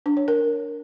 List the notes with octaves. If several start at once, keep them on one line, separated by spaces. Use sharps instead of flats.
D4
C#5
A#4